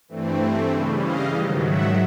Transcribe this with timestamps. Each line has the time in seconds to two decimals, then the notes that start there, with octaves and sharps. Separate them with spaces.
0.08 G2 E3 A3 C4
0.71 C#3 E3 G3
1.03 D#5 F5
1.34 G#2 D#3 F#3
1.65 E5 F#5